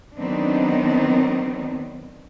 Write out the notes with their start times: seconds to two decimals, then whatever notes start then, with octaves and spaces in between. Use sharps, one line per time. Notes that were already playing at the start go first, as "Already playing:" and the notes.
0.18 D#3 F#3 B3 C4 D4 D#4